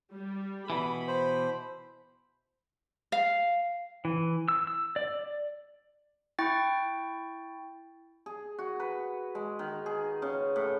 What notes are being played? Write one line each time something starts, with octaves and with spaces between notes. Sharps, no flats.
G3
B2 E3 B5
C5
F5
E3
E6
E6
D5
E4 G5 C#6 A6
G#4
F#4
B4
G#3
D#3
G#4
C#3
A2